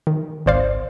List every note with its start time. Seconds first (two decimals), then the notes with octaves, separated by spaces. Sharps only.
0.07 D#3
0.46 G#1 C#2 C5 D5 F5